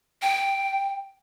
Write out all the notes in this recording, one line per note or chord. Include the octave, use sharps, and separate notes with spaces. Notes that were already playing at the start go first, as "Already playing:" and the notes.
G5